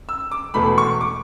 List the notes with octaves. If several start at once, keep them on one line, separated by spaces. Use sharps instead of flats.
E6
D6
E1 E2 B2 A3 B5
C#6
D6